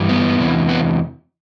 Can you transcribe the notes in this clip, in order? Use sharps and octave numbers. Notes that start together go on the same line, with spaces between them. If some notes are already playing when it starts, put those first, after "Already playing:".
Already playing: G2 E3 G3
B3
E2 C3 E3
B3